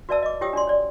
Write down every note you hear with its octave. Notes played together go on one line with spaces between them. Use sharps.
F#4 B4 D5 E5 A5 E6
D#5 D6
F4 G4 C#5 G5 D#6 E6
D4 F#4 D5 C6
C#5 D5